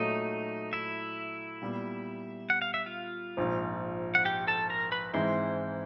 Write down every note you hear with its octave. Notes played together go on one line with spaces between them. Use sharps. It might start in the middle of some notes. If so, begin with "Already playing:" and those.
Already playing: A#2 F#3 A3 D#4 D#5
E4 E5
A#2 G3 B3
F#5
F5
E5
F4 F5
A#1 G#2 F3
F#5
G4 G5
A4 A5
A#4 A#5
B4 B5
G#2 E3 G#3 C4 E4 C5 C6